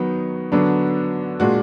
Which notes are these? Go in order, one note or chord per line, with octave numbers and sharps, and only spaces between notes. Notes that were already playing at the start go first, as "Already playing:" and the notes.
Already playing: D#3 F#3 B3 D#4
D3 F#3 B3 D4
A#2 G#3 D4 F#4